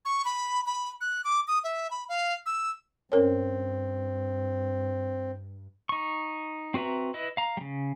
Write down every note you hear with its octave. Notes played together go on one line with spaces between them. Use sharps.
C#6
B5
B5
F#6
D6
D#6
E5
B5
F5
E6
G2 C4 C#4 A#4 C#5
D#4 C#6
C4 F#4 B4 E5 A#5
E4 B4 D#5
F5 A#5
C#3 G3